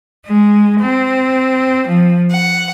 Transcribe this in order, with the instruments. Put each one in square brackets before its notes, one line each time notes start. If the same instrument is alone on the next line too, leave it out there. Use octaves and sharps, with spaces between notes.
[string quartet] G#3
C4
F3
F#5